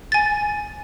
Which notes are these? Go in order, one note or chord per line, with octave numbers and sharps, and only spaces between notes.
G#5 A6